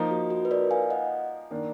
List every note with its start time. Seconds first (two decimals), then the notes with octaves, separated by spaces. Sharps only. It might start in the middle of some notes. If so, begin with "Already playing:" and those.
Already playing: F3 A#3 D#4
0.11 F#4
0.30 F#4
0.45 B4
0.51 A#4 D5
0.71 F5 G#5
0.90 D#5 F#5
1.51 D#3 A#3 D4